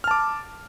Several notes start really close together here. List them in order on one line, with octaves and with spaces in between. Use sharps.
F6 A5 D6